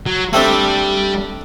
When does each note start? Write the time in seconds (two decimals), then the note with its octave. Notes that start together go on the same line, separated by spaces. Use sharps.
0.06 F#3
0.33 G3 A3 C4 D4